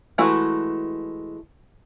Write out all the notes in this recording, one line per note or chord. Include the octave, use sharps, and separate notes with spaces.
E3 G#3 A3 E4 F#4